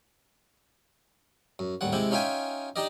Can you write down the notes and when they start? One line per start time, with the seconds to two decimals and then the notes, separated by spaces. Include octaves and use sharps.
1.59 F#2
1.81 A1 D#2 G3 F#5
1.93 C3 G#3 E4 G4
2.11 C#4 D#4 F4 E5 G5 G#5
2.76 D4 D#4 G4 D5 D#5